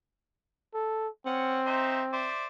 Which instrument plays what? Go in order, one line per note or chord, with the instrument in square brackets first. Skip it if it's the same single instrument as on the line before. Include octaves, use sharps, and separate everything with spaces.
[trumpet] A4
[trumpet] C4 [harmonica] C#4 F#5
[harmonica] D#4 C5 E5
C5 D5 E5